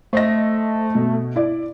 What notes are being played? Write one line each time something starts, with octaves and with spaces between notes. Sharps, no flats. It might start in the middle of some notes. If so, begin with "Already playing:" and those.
A3 C5 D#5 A#6
B2
E4 D5